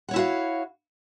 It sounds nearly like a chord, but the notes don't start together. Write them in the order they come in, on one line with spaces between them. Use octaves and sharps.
F#5 C#5 E4 F#4 F5